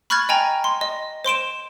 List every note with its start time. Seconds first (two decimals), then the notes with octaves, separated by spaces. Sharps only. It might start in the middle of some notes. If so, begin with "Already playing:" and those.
0.10 B5 C#6 F6 F#6 G#6 A6
0.29 D#5 G5 G#5 A#5
0.64 C6
0.81 D#5
1.25 C5 C6 D7 E7